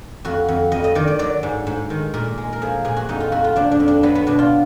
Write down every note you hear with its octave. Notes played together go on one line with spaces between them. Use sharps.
F2 F#4
F2
F2 D#5
D#5
D#3 D5
D5
F#3 D5
G#2
G#2
D#3
A#2 A#4
G#3
A#4
F3 G#4
A#2 G#4
F#4
F2 D#4
F4
F2 F#4
F4
F3 D4
D4
F2
D4
F#3 B3
B3
B2 D4
F4